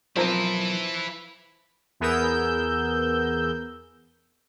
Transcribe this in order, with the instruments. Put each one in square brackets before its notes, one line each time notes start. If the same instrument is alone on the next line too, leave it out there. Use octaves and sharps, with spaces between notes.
[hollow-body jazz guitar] B1 A#4 [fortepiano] F3 C4 [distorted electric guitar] E4 B4
[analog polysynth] E2 B3 G#4 A#4 E6 G6